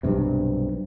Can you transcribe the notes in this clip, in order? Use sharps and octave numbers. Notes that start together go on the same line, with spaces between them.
B1 G2 C3